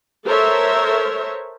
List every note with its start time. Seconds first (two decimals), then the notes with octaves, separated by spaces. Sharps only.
0.24 A4 A#4 C5 C#5 E5